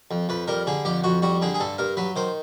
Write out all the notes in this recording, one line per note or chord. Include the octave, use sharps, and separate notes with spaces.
F2
F2 B4
G3 A#4
D3 G#4
F2 G4
F2 F#4
G3 F#4
D3 G#4
G#4
G2 A4
G2 A#4
F#3 B4
D#3 C5